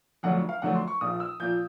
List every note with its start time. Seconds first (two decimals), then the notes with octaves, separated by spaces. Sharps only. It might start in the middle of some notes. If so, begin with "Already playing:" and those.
0.23 F2 D3 F#3 A3 D4 F#5
0.49 F5
0.62 F2 D3 F#3 A3 D4 F#5
0.75 C6
0.88 C#6
1.01 A#1 A#2 F3 D#6
1.20 E6
1.40 A#2 F3 G6